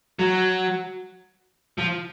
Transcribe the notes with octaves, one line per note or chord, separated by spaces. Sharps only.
F#3
F3